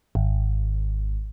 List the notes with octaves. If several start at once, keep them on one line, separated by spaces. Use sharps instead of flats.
G#1